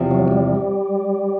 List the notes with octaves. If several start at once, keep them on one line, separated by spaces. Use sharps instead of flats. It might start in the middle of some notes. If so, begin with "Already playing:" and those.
Already playing: E2 C3 F3
F#3
G3